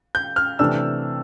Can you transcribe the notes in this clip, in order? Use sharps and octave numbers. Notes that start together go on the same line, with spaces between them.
G6
F6
C3 E3 A3 D4 E6